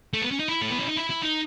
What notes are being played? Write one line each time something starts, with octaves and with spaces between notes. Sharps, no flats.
A3
B3
C#4
D#4
E4
A3
B3
C#4
D#4
E4
E4
D#4